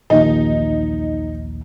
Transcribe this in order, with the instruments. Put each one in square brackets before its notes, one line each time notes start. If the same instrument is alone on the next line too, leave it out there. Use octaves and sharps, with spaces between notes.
[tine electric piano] A#1 D#2 [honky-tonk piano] D#4